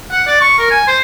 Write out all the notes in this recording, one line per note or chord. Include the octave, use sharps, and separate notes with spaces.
F#5
D5
C#6
A#4
G#5
C5